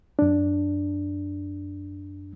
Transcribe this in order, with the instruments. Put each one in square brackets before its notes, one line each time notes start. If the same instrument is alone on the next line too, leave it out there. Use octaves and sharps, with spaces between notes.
[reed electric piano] F#2 D4